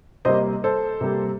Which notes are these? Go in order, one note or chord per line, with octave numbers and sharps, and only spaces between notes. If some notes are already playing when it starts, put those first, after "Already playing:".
C3 G3 A#3 C5 D#5
A4 C5
C3 G3 A#3